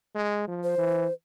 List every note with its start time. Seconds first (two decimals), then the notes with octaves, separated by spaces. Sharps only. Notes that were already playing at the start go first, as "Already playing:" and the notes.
0.15 G#3
0.48 F3
0.63 C5
0.78 E3